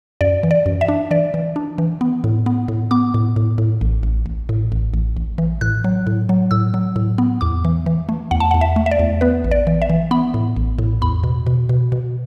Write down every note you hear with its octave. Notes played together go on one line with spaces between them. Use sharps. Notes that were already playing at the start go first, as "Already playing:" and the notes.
F#2 D5
E3
D5
F#2
E5
D4
E3 D5
E3
D4
E3
B3
A2
B3
A2
B3 D6
A2
A2
A2
A1
A1
A1
A2
A1
A1
A1
E3
A2 F#6
F#3
A2
F#3
A2 E6
F#3
A2
B3
E2 D6
E3
E3
A3
E2 F#5
A5
F#5
E2
E5
A3
E5
D5
E2
B3 B4
A1
D5
E3
E5
E3
B3 B5
A2
A1
A2
E2 B5
B2
B2
B2
B2